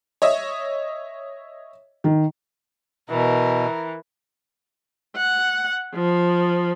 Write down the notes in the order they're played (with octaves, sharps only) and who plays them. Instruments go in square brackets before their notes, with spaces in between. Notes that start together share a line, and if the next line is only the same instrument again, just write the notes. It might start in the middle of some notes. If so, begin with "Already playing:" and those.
[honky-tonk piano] C#5 D#5 E5
[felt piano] D#3
[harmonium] B2 [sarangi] E3 [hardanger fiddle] A#4
[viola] F#5
F3